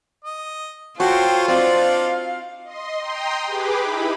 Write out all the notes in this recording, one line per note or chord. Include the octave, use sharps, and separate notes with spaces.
D#5
F4 F#4 A4 C5 C#5 G5
C4 D4 D#4 D5 F5
D#5 C6
G5 A#5 C6 D#6
G4 G#4 B4 D6
D#4 E4 B5